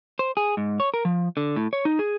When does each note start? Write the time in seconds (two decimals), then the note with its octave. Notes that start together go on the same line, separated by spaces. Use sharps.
0.19 C5
0.37 G#4
0.57 G#2
0.80 C#5
0.94 A#4
1.05 F3
1.37 D3
1.56 A2
1.73 C#5
1.85 D#4
1.99 G#4